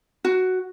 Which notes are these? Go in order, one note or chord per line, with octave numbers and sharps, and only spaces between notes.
F#4